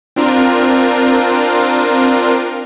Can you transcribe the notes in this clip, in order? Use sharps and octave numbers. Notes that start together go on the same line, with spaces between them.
C4 D4 F4 A#4